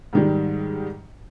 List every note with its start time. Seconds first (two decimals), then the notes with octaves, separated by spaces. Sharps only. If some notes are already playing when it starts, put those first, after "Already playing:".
0.13 G#2 D#3 G3